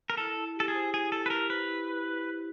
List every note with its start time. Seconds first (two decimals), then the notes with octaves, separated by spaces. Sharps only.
0.10 A#4
0.17 E4 A4
0.37 E4
0.56 G4 A4
0.68 G#4
0.74 C5
0.93 E4 G#4
1.12 E4 A4
1.26 B4
1.30 G4 A#4
1.50 B4 C5
1.68 E4
1.87 E4